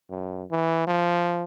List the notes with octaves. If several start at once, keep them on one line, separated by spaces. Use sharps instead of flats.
F#2
E3
F3